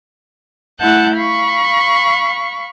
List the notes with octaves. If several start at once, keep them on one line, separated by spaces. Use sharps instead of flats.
A3 E4 F#5 A5 F#6 G6
F5 B5 C#6